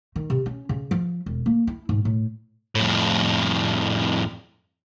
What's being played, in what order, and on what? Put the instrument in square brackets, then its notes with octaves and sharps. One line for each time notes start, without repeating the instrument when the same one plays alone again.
[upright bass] D#3
C3
C#4
C#3
F3
E1
A#3
E4
G#2
A2
[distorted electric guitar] F2 A2